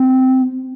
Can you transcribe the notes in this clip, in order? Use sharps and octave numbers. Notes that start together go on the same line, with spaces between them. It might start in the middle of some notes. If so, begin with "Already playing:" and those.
Already playing: C4